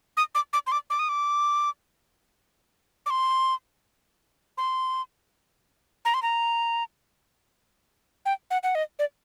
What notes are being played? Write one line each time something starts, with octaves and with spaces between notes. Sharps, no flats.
D#6
D6
D6
C6
D6
D6
D#6
D6
D6
C6
C6
A#5
C6
A#5
G5
F#5
F#5
D#5
D5